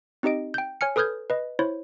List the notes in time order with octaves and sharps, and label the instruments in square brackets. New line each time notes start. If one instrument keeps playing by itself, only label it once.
[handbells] C4 D#4 G4 D#5 D7
G5 G6
C#5 G#5 F6 C#7
A4 B4 D#6 F6 G6 G#6
B4 D#5
E4 C5 C#5